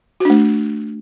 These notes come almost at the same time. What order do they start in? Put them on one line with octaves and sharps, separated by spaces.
F#4 D4 A3